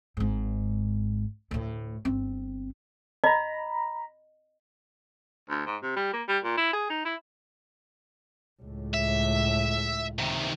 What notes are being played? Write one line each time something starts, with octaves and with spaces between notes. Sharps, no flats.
G#1 G#2
D2 A2
G1 C4
D#5 A#5 B5
D2
G#2
C3
G3
A#3
G3
A#2
E4
G#4
D#4
E4
C#2 A2
E5
C3 D#3